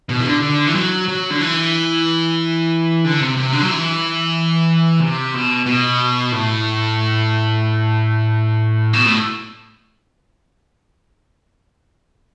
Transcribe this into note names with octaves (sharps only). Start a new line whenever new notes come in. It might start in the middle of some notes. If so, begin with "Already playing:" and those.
B2
E3
D3
D3
E3
F#3
F#3
D3
E3
D3
C3
C3
D3
F#3
E3
C3
B2
B2
A2
B2
A2